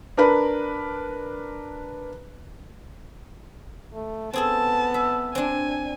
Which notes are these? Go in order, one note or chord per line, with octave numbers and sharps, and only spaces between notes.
D4 A#4 B4 B5
A3
B3 C4 G#4 A4 A5
E5
C4 D4 G#5